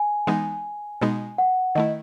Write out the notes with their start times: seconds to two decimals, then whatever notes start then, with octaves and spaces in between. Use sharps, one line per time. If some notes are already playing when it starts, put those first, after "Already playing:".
Already playing: G#5
0.27 E3 G#3 B3 D#4
1.01 B2 G#3 B3 D#4
1.38 F#5
1.75 D#3 A3 E4 D#5